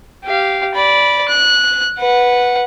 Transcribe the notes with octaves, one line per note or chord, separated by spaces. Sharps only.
G4 F5
D5 B5
F#6
B4 F#5